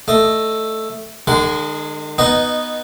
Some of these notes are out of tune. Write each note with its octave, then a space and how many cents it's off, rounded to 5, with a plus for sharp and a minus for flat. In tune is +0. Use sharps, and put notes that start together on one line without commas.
A3 +0 D#5 +0
D#3 -45 G#3 +0 C6 -35
B3 +0 D#4 +0 D#5 -15